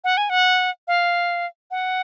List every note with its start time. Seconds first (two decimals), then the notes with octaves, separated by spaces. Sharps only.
0.04 F#5
0.17 G#5
0.30 F#5
0.88 F5
1.71 F#5